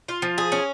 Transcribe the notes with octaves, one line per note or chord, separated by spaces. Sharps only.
F4
F3
G#4
C#4